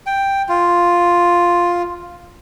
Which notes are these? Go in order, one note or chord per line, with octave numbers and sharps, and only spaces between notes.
G5
F4